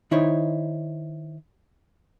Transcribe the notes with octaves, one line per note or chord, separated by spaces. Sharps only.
D#3 D#4 E4 C5 C#5